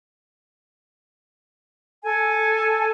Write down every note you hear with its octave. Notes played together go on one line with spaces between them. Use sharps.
A4 G#5